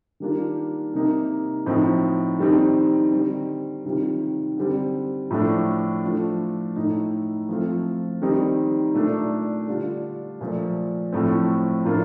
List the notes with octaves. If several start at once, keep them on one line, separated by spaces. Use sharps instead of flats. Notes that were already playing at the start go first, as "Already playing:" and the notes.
D#3 G3 A#3 D4 F4
C3 G3 A#3 D#4
A2 F3 C4 D#4
D#3 G3 C4 D#4
D3 G3 C4
C3 D#3 G3 C4 F4
D3 G3 C4
A2 F3 A3 D4
F3 A3 D4 F4
A2 A3 D#4
F3 A3 C4 F4
D#3 G3 C4 D#4
A#2 A3 D4
D3 G3 D4 F4
A#2 F3 A3
A2 F3 A3 C4
A2 F3 A#3 D4 F4